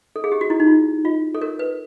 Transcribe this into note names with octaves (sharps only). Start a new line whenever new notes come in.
A4
G#4
G4
F#4
E4
D#4
F4
F4
A4
A#4
B4